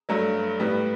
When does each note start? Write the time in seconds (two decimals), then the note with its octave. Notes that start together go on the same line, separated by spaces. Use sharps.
0.09 G2 F#3 A3
0.60 A2 G3 B3